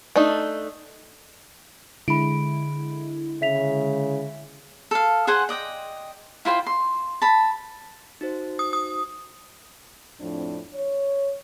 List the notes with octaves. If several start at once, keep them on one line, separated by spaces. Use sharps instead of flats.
A3 D4 D#4
D3 G#3 E4 B5 D7
C#3 E5 B6 F7
A4 F5
G#4 C5 F#5 G#5
D5 D#5 F#5 G5
E4 F4 C5 G5
C6
A5 B5
D#4 F#4 C5
D#6
D#6
F2 A2 F3 C4 D4
C#5